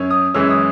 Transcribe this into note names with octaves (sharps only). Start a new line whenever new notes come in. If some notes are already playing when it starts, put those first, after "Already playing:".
Already playing: F#2 C#4
D#6
F#2 E3 G#3 C#4 E6
D#6